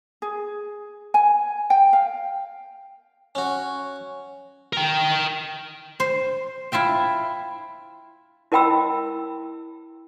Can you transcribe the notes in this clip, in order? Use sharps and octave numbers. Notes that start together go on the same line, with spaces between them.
G#4
G#5
G5
F5
C#4 F#4
A#4 G5
C5
E4 F4 E5 G5
E4 A#4 D#5 G5 B5 E6